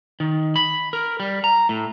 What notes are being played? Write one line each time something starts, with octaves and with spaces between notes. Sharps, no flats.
D#3
B5
A#4
G3
A#5
A2